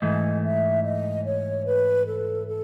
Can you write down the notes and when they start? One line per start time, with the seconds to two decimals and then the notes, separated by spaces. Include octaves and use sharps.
0.01 G#2 E3 A3 D#5
0.44 E5
0.84 D#5
1.25 C#5
1.66 B4
2.07 A4
2.48 A4